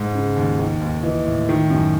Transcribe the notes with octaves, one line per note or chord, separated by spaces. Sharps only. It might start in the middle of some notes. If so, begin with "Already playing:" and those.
Already playing: G#2
C#3
D#2
D#3
D#2
E3 D#5
A2
D#3
F#2